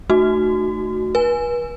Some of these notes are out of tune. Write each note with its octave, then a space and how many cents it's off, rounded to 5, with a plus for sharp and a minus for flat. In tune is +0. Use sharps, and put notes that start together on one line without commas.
A3 +0 D#4 -25 F#4 +0
B4 -40 G#5 +0